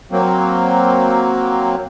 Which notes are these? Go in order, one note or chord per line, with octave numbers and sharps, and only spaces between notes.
F#3 A#3 C4